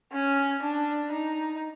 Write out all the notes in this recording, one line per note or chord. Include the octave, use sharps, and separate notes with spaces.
C#4
D4
D#4